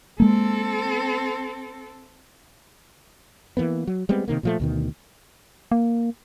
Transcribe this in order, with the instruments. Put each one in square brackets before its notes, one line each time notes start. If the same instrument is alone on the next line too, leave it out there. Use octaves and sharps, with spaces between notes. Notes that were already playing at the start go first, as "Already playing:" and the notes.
[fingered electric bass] G#3 A#3 [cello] C4 A4
[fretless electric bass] E3 G3 A#3 B3
F#3
G3 G#3 B3 C4
C3 D#3 A#3
A#2 F3 A3
D2 B2 D#3
[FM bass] A#3